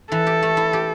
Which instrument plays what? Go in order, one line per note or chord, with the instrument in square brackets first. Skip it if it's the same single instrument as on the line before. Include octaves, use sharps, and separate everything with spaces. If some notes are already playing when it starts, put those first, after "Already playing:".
[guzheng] E3 [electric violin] A4
[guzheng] G4
A3
E4
G4